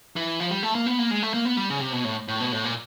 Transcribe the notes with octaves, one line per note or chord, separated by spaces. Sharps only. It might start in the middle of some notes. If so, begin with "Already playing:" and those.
E3
F3
G3
A3
A#3
B3
A#3
G#3
A3
A#3
B3
G3
C#3
C3
B2
A2
A2
B2
A2
A#2